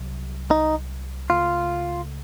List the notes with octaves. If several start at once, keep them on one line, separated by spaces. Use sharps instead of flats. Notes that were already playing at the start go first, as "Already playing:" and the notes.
Already playing: C2 C3 F#3
D#4
C#2 C#3 A3 F4